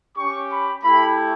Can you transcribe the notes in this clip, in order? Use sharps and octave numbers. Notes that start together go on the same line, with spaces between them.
C#4 G4 C#6
B5
A3 E4 G4 B5